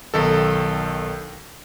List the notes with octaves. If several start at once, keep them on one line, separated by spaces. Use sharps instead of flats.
B1 D#3 A4